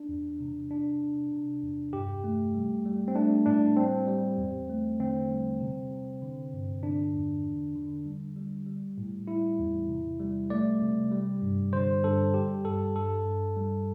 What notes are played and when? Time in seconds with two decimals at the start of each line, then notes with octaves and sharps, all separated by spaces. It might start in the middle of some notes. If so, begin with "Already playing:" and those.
Already playing: D4
0.09 E2
0.40 C3
0.71 C3 D4
1.01 C3
1.31 C3
1.63 E2
1.93 G2 G4
2.24 A3
2.54 G3
2.86 G3
3.08 C4
3.15 A3 D4
3.46 A2 D4
3.77 G3 C4
4.07 G3
4.38 E2
4.69 A3
5.00 D3 C4
5.30 G3
5.60 C3
5.91 C3
6.22 D3
6.53 G2
6.83 D3 D4
7.14 E2
7.44 D3
7.75 D3
8.06 G3
8.36 G3
8.66 G3
8.98 A2
9.27 G3 E4
9.58 E2
9.89 C3
10.20 G3
10.50 A3 D5
10.81 C3
11.12 G3
11.42 G2
11.72 D3 C5
12.04 G2 A4
12.34 G3 G4
12.65 G2 A4
12.96 G2 A4
13.26 G2
13.56 G3